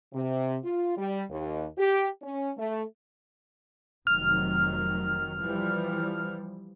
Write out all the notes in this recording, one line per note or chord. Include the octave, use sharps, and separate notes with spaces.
C3
F4
G3
D#2
G4
C#4
A3
F1 D#3 F#3 F6
E3 F3 G3